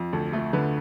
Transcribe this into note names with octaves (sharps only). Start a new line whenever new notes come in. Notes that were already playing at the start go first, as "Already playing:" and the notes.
Already playing: F2
D2 A4
A3
D3 B4